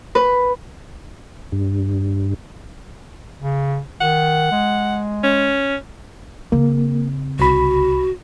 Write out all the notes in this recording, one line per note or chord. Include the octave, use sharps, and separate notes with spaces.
B4
G2
C#3
D#3 F#5
G#3
C#4
C#3 A#3 C4
C2 F#4 B5